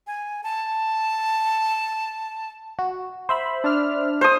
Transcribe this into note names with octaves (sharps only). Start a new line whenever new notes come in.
G#5
A5
F#4
C5 E5 B5
D4 F6
C5 D#6